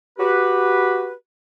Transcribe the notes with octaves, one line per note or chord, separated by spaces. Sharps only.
F#4 G4 B4